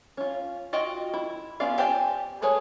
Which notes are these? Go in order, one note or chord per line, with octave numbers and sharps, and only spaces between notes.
C#4 F4
F4 F#4 D#5 G5
E4
B3 C#4 F4 D5 F5
G4 C5 D5 G#5
A3 G#4 B4 C#5 G#5